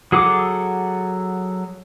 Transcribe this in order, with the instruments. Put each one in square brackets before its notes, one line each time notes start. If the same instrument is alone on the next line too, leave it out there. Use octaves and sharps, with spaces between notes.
[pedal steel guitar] F#3 G#4 A4 F#5 D6